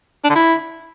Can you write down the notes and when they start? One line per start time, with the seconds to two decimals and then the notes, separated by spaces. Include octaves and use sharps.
0.24 D4
0.29 D3
0.35 E4